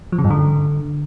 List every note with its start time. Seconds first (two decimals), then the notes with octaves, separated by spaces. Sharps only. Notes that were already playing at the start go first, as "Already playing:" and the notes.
0.12 F3
0.18 C#3
0.24 G2
0.31 D3